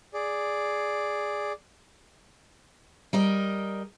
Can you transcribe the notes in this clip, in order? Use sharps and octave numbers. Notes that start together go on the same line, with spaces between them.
G#4 D5
G3 A#4 D#5